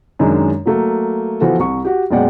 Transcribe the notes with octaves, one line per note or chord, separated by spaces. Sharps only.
F#2 D#3 G#3 D4
F#3 A3 A#3
E3 F3 B3 F#4 A4
C2 C#6
F#4 G4
F#1 B2 G#3 D5 F#5 G5